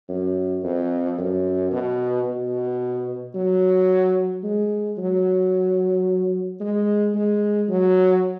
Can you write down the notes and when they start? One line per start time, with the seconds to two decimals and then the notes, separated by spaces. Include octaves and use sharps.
0.09 F#2
0.63 F2
1.18 F#2
1.72 B2
2.26 B2
3.34 F#3
4.43 G#3
4.98 F#3
6.60 G#3
7.14 G#3
7.68 F#3